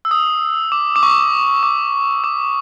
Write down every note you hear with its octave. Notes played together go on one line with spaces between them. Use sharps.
E6
D#6
D6
D6
C#6
D6
D6